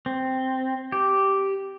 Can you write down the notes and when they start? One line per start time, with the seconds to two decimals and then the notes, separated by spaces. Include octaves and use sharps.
0.06 C4
0.92 G4